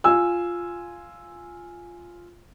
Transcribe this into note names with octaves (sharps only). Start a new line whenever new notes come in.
F4 G#5 E6